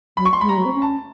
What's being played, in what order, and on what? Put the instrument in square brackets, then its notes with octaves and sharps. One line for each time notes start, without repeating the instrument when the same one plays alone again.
[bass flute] F#3 [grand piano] B5
[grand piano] C#6
C6
[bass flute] G#3 [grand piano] B5
[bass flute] G3 [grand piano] A#5
[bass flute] F#3
C4
C#4
[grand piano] A5